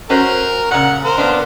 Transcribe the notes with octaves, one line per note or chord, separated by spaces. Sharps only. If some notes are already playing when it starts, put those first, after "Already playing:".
C#4 F#4 A#4 C5
A#2 C#3 F#5
A#4 C5
A#3 B3 D4